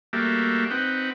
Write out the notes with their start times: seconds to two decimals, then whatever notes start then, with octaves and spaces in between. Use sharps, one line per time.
0.13 G3 A3 A#3 F#4 G4 E5
0.71 C4 D#4 B4 F#5 G5